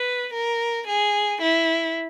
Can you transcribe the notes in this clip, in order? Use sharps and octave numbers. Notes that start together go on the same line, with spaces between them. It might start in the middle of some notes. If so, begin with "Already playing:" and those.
Already playing: B4
A#4
G#4
E4